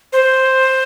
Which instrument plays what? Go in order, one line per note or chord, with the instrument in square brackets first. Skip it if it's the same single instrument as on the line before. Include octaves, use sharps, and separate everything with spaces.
[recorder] C5